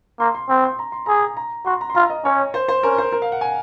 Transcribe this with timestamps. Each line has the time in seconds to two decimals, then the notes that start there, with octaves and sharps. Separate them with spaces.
0.20 A#3 C6
0.35 C6
0.49 C4
0.64 C6
0.79 A#5
0.92 C6
1.06 G#4 A#5
1.37 A#5
1.66 F#4 C6
1.81 A#5
1.90 C6
1.95 F4 A#5
2.10 D#5
2.25 C#4 C#5
2.54 C5
2.68 C5
2.83 C#4 A#4
2.98 C5
3.12 A#4
3.22 F5
3.32 F#5
3.41 G#5